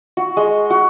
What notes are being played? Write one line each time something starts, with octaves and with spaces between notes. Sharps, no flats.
F#4
G#3
F#4